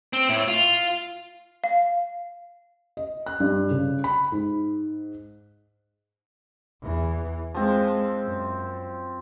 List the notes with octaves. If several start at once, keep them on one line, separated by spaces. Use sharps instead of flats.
C4
A2
F4
F5
D#5
F#6
G2
C#3
B5
G#2
E2 E3
F3 G#3 C4
F#2